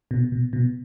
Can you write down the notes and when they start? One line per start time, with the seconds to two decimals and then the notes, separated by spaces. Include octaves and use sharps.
0.11 B2
0.32 B2
0.53 B2